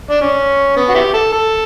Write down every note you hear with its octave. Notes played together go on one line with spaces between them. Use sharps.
D4
C#4
B3
F#4
B3 E4 G4
A4
A4